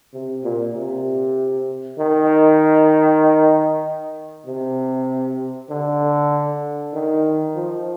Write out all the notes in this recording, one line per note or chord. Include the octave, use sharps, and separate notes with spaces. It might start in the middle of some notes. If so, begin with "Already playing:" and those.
C3
A#2
C3
D#3
C3
D3
D#3
F3